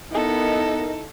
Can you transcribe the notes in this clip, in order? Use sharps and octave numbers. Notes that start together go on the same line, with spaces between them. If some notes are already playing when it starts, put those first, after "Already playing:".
B3 D#4 E4 A4 A#4 D#5